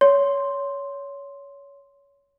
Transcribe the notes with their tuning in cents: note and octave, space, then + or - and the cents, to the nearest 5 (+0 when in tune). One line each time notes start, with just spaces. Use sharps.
C#5 +20 C6 +0